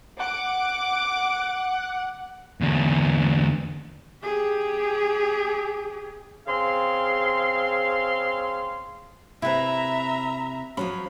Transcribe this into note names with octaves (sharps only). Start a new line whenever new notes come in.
F#5 D6
E2 D3
G4 G#4
C#3 C4 G#4 F5 C6
C3 C4 E4 B4 E5 A#5
F3 F#3 C#4 B5